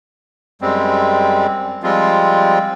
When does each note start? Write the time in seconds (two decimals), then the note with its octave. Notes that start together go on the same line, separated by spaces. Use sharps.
0.62 F#2 G3 G#3 C4
1.83 F3 G3 G#3 C4 F4